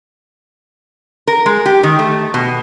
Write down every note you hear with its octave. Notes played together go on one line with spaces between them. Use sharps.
A#4
G#3
G4
D#3
A3
B2